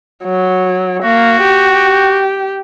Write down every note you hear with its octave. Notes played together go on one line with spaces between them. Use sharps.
F#3
A#3 F#4
G4